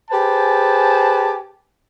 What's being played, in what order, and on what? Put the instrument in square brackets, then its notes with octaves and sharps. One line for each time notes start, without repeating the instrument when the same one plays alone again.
[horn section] G4 G#4 B4 C5 G#5 A5